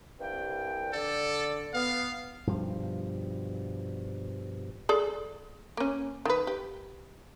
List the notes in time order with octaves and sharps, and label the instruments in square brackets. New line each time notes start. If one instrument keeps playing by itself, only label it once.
[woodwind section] C2 G2 G5
[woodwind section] D3 D5 [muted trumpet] A4
[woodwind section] B3 [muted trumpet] F5
[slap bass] G2 B2 F3
[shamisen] G#4 A4 D5
A#3 C#4
D#3 B4
G4